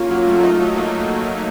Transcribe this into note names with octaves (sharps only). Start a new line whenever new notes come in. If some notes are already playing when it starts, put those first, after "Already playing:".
Already playing: A#3 C#4 F4
F#3
A3
D#4
F#3
A#3